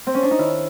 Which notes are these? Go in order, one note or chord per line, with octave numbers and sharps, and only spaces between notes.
C4
C#4
D4
D#4
D#3 E4